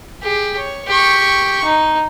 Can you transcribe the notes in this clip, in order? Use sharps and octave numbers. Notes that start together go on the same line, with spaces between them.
G4 G#4
C#5
G4 C#6
D#4